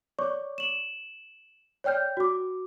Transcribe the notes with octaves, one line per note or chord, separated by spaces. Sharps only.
C#5 D5 C#6 D6
E7 F#7
C#5 D5 G5 F6 G6
F#4 D6